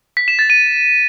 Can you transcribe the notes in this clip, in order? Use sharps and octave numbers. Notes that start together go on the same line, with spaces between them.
B6
E7
A6
D#7